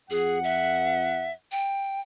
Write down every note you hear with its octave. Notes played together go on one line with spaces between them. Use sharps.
F2 G#4 F#5
E5
G5